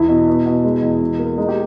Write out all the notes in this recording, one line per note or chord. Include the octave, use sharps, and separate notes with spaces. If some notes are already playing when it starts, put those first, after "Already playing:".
Already playing: E2 E4
B2
B2
B2
G#3
E2
B2
A#3
G#3 D#4
G4